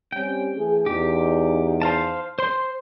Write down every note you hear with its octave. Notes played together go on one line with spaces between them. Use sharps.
G3 C4 C#4 G5
E3 A3 G#4
E2 D#4 G4
C5 F5 A5
C5 C6